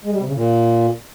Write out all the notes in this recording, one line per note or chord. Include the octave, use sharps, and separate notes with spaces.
G#3
G3
C3
C#3
A#2